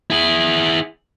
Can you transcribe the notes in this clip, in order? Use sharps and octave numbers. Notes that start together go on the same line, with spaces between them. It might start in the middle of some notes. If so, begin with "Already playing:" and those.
E4 G#4